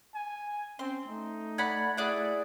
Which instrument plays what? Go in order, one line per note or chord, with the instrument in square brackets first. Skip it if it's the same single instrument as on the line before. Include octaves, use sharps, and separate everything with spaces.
[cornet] G#5
[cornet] C4 [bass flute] C#4 [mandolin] C6
[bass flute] A3 [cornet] D#4
[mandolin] D5 F#5 B5 [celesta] G#6
[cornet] E4 [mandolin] G#4 D5 F#5